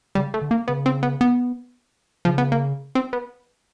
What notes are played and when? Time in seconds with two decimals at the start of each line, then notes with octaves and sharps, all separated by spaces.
0.15 C#3 G3
0.34 A3
0.41 D3
0.51 A#3
0.68 C#3 B3
0.86 C4
1.03 B3
1.21 B3
2.25 C#3 F3
2.38 B3
2.52 A#3
2.95 C4
3.13 B3